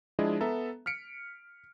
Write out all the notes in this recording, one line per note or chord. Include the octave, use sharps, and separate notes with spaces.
F3 G#3 D4 E4 G#4 D#5
B3 A4 E5 A#5
F6 B6 C#7 D7